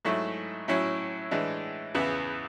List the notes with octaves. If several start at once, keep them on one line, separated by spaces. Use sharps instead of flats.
G#2 F#3 A3 E4
A2 F#3 C#4 E4
A2 E3 G#3 D4
E2 C#3 E3 B3 E4